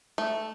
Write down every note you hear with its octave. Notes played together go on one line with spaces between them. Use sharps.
A3